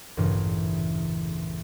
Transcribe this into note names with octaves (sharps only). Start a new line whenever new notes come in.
A1 E2 G2 A#2 C#3 E3